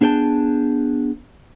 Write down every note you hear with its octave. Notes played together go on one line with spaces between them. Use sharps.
B3 D4 G#4 A4 G5 A5